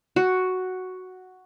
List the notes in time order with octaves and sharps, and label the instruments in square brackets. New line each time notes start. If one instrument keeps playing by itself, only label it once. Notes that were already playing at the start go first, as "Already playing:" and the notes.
[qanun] F#4